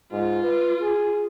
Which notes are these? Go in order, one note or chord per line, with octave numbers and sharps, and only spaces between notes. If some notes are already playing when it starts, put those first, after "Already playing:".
G#2 F4
B4
G#4